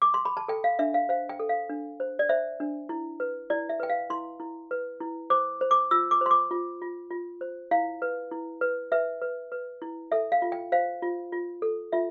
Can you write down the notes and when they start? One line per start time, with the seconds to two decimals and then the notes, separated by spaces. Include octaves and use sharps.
0.02 D6
0.14 C6
0.25 B5
0.37 A5
0.48 A4 G5
0.64 F5
0.79 D4 E5
0.94 F5
1.09 C5 F5
1.29 G5
1.40 A4
1.49 F5
1.69 D4
2.00 C5
2.19 D5
2.29 C5 E5
2.60 D4
2.89 E4
3.20 B4
3.50 E4 D5
3.69 E5
3.80 B4 G5
3.90 F5
4.10 E4 C6
4.40 E4
4.71 B4
5.00 E4
5.30 C5 D6
5.61 C5
5.71 D6
5.91 F4 E6
6.11 D6
6.21 C5 C6
6.31 D6
6.51 F4
6.82 F4
7.11 F4
7.41 C5
7.71 E4 F5
8.02 B4
8.31 E4
8.61 B4
8.92 B4 E5
9.22 B4
9.52 B4
9.82 E4
10.12 A4 E5
10.32 F5
10.42 F4
10.52 G5
10.72 C5 F5
11.02 F4
11.32 F4
11.62 A4
11.92 F4 E5